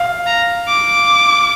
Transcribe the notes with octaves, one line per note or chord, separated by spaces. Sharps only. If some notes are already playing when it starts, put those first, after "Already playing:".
Already playing: F5
A#5
D6